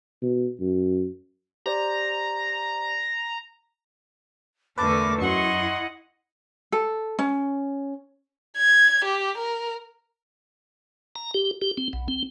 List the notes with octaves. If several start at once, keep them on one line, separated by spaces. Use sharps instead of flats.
B2
F#2
G4 C5 D5 A#5
E2 D3 A3 A#4 B4 A5 D6
F#2 E4 D#5 F#5 C6 C#6
A4
C#4
G#6
G4
A#4
A#5
G4
G4
C4
B1
C4